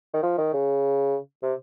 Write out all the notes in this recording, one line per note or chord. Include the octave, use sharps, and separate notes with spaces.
D#3
F3
D#3
C#3
C3